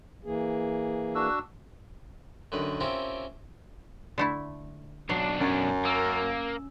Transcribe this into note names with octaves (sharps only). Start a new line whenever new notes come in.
E3 A#3 G#4
D4 F#4 E6
F#2 D3 D#3 B4
C4 C#4 E4 F4 G4 A#4
D3 A3 E4
B1 F#3 D4 C7
F#2 C#4
A#3 E6